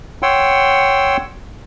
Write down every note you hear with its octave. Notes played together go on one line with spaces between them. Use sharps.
C#5 F#5 G5 C6 E6